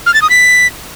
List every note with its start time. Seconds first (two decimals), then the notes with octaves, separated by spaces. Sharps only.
0.06 F6
0.14 A6
0.22 D#6
0.30 B6